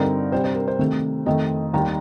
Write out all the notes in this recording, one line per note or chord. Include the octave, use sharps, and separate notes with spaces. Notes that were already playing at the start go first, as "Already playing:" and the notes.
Already playing: G2 D3 G3 C4 D#4 A#4
C3 G3 D4 C5
C5
A#4
C5
C3 D#3 A3
F2 D#3 A3 C4 D#5
D#2 D#3 G3 A#5